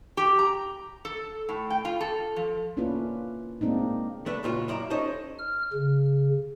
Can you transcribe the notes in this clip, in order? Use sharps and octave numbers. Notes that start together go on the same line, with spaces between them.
G4
A#5
A4
A2
G5
F4
A4
F3
A#3 C#4 D4 E4 F4 B4
G#3 A#3 C4 D4 D#4
A3 D4 B4
C#2 A#2 F4 F#4
F#2 E4 D5 A#5
C#4 D#4 A4 C5 A5
F6
C#3